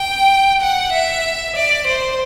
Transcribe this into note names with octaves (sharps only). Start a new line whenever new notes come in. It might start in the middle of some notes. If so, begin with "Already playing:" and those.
Already playing: G5
F#5
E5
D5
C5